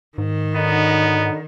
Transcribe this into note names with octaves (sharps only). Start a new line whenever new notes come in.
G#2 D#3
D3 F#3 B3 D#4